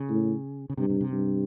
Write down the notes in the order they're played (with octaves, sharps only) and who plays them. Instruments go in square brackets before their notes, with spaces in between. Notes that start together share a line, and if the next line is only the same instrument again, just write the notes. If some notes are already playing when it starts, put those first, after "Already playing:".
Already playing: [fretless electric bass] C#3
[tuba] A2
[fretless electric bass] C#3
[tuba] G2 [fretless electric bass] C3
[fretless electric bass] C3
C3
[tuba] G2